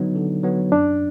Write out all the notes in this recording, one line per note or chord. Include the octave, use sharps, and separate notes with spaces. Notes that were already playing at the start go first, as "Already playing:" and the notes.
Already playing: D3 F#3 B3 D#4
D3
F#3 B3
F#2 D4